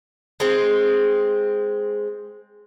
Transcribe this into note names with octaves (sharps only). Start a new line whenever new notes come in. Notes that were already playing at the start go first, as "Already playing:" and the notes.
G#3 C4